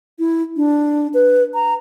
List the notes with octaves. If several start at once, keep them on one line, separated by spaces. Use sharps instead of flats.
E4
D4
B4
A#5